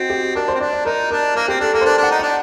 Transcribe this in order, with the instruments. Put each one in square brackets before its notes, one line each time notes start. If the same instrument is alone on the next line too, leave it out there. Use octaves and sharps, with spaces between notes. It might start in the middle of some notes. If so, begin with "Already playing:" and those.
Already playing: [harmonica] C4 [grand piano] D#4 F#4
[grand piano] G4
[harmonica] D4 [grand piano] A#4
[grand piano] C5
[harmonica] C4
[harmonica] D4 [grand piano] D5
[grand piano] D5
[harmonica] D#4 [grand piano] A#4
[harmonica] D4 [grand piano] A#4
[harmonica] A#3 [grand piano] A#4
[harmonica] C4 [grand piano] G4
[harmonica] D4 [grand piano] A4
[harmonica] A#3 [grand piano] A4
[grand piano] C5
[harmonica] D4 [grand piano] A#4
[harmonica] D4
[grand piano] F#5
[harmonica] D#4
[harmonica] D4 [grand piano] F#5